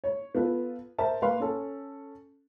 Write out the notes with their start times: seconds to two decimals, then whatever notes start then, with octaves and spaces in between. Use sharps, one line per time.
0.04 C#5
0.35 B3 F4 A4 B4
0.98 A#4 C5 E5 A5
1.22 A#3 B4 F5 C6
1.40 C#4 A4